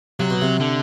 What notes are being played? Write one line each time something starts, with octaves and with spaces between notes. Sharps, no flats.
C3 F#3
B2
C3
D3